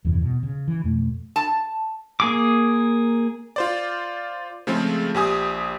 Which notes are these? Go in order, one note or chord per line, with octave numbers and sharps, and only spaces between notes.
E2 G2 C3 E3
B2
C#3
E3
F2 B2 A3
A5
A#3 G#4 D6
F4 C5 D5
C#3 F3 G#3 A3 C4
A#1 G4 G#5 D#6